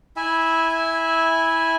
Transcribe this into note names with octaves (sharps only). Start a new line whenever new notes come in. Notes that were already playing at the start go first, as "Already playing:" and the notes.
E4 E5 G#5